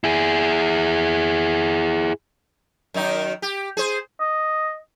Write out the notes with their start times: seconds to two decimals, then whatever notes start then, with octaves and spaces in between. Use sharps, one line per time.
0.04 E4 G#4
2.94 F#2 D#3 D#4
3.42 G4
3.77 G#4 C5
4.20 D#5